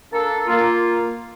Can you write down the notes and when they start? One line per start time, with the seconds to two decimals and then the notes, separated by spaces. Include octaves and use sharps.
0.12 A#3 D4 A4
0.46 A#3 F4